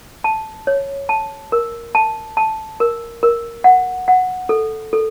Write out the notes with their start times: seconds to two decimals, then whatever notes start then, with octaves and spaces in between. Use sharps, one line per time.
0.24 A5
0.67 C#5
1.09 A5
1.52 A#4
1.95 A5
2.37 A5
2.80 A#4
3.23 A#4
3.64 F#5
4.08 F#5
4.49 A4
4.93 A4